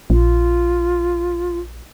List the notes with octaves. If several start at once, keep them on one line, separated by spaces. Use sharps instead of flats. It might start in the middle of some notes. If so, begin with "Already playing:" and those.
A#1 F4